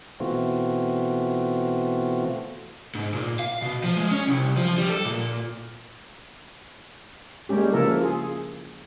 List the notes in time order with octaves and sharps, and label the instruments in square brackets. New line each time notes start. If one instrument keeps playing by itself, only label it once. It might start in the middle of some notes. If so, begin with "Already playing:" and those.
[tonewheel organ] B2 E3 A3 C4 F4 F#4
[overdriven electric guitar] G#2
A#2
F5
B2
F3
G#3
C#4
C2
F3
G3
A4
A#2
[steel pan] G3 G#3 A#3 C#4 G4
C#3 F3 A#3 E4 A4 A#4
F4 G#4